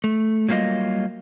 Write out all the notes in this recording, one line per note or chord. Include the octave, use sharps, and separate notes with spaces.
A3
F#3 G3 A#3 F4 D#5